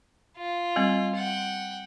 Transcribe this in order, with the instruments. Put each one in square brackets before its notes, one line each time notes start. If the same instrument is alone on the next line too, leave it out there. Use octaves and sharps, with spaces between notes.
[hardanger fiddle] F4
[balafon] G3 C4
[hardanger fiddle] F#5 G5